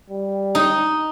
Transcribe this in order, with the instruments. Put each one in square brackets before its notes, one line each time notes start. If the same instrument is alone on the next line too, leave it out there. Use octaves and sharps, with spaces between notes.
[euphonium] G3
[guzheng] D#4